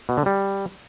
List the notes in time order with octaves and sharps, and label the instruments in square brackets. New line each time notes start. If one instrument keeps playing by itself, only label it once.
[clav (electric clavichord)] B2
D3
G3